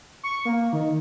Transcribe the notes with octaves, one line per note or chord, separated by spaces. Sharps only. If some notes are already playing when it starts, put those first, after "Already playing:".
C#6
A#3
D#3